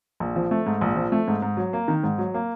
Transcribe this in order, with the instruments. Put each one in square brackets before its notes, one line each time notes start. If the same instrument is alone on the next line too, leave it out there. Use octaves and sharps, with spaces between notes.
[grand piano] A#1
F3
A3
G#2
A#1
F3
A3
G#2
G#2
F#3
A#3
D#3
G#2
F#3
A#3